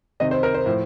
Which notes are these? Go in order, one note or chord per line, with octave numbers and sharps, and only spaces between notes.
C3 D#3 D#5
C5
A#4
C5
A2 F3